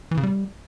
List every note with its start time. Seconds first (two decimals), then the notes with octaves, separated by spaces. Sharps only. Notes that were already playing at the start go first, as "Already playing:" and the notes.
0.11 E3
0.17 C#3
0.23 G3